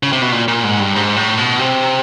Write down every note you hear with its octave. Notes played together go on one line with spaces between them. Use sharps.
C#3
C3
B2
A#2
A#2
G#2
G2
G#2
A2
B2
C3